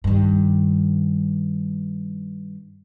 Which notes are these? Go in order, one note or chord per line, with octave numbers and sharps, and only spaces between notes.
G2 D#3